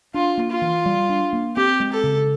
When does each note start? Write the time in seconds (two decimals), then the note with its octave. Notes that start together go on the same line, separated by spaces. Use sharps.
0.14 D4 F4
0.38 A#3
0.50 F4
0.62 E3
0.86 G3
1.09 D4
1.33 A#3
1.56 C4 G4
1.80 G#3
1.92 A4
2.03 C#3